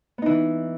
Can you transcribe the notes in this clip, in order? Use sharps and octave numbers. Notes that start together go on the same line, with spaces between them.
E3 B3 D#4